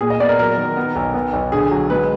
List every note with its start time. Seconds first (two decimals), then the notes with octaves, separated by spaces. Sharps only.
0.01 A#2 G#4
0.10 D#5
0.20 B3 D5
0.29 A#4
0.39 F#3 A#4
0.58 D#3
0.77 B3
0.95 B1
1.14 B3
1.33 B1
1.52 D3 G#4
1.71 F#3
1.90 G#3 B4